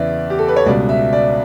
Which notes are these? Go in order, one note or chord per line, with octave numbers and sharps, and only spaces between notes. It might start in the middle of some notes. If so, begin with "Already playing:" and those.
Already playing: E2 C#3 E3 D5 E5
G4
A4
B4
C#5
C#2 B2 G3 D5
E5
D5